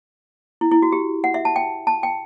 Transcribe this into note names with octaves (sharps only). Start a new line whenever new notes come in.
E4
E4
F#4
G4
F#5
E5
A5
G5
A5
G5